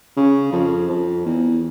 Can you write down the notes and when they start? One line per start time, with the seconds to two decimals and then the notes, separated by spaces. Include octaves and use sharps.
0.16 C#3
0.52 F2
0.89 F2
1.25 E2